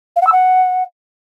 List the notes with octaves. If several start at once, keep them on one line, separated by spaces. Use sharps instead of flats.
F5
F#5
E6
F#5